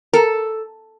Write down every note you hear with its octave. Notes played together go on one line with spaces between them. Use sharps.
A4 A#4